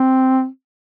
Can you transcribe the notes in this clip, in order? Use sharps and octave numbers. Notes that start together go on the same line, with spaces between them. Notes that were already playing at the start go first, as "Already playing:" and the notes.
Already playing: C4